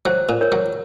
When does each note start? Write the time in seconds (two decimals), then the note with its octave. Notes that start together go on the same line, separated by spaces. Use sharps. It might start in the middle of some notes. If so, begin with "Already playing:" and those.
0.05 F#3 C5
0.29 A#2
0.41 A#4 C#5
0.52 F#3